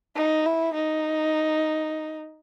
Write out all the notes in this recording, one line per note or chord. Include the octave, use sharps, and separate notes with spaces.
D#4
E4
D#4